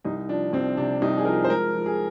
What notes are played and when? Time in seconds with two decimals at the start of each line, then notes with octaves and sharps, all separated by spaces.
0.04 C2 D#4
0.29 F3 D4
0.53 C2 C4
0.77 C3 D4
1.02 C2 D#4
1.18 G#4
1.25 F3 A#4
1.44 C5
1.50 G#3 A#4
1.75 F3
1.86 G#4